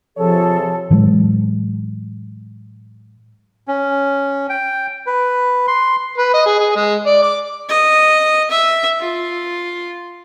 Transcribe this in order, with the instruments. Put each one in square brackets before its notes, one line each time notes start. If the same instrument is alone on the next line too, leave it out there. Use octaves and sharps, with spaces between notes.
[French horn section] C3 G#4 C#5 [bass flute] F3 [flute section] A4
[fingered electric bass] A2 E3 F#3 G#3
[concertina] C#4
G5
B4
C6
[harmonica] B4
D#5
G#4
G#4
G#3
D5
D6
[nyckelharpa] D#5
E5
F4